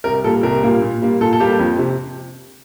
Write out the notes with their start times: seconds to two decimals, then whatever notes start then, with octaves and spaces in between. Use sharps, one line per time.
0.04 C2 A#4
0.24 A#2 G3 A#3 A4
0.43 C2 A#4
0.63 A#2 G3 A#3
0.82 A#2
1.02 G3 A#3
1.21 A#2 A4
1.33 A4
1.40 G3 A#3 G4
1.59 F2
1.79 C3